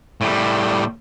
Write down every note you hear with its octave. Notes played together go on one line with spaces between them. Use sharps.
A2 G3